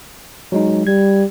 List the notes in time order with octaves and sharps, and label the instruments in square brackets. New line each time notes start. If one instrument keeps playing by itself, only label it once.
[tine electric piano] F#3 G#3 D#4
[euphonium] G3 [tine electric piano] G#6